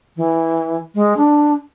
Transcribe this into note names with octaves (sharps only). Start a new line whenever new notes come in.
E3
G#3
D4